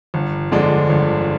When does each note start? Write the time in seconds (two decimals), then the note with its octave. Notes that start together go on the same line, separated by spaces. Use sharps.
0.14 G1
0.52 F2 D3 G#3 D4
0.89 G1